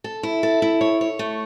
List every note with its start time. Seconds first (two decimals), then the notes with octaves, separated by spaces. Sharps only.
0.04 A4
0.23 E4
0.43 A4
0.62 E4
0.81 C#5
1.01 C#5
1.19 A3